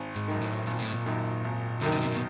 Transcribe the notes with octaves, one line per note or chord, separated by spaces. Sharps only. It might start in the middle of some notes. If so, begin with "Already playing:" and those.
Already playing: G#1
G#2
F#2 D#3
A2
G#1 A#2
A2
A#2
F#2 D#3
G#1
F#2 D3 D#3
C#3
C3
B2